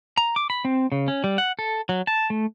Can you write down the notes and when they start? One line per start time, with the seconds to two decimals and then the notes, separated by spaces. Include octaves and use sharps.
0.17 A#5
0.36 D6
0.50 B5
0.65 C4
0.92 C#3
1.08 C#4
1.24 G3
1.38 F#5
1.59 A4
1.89 F#3
2.07 A5
2.30 A3